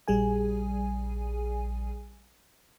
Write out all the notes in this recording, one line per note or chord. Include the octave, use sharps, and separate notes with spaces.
A#1 G3 G#4 G#5